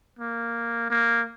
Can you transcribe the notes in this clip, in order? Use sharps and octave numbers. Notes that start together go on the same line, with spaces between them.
A#3
A#3